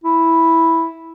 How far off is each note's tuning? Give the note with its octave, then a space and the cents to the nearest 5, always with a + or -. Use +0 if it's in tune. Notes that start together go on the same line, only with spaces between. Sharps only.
E4 -5